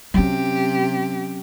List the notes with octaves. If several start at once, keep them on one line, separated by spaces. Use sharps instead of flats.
C3 F#3 C#4 G4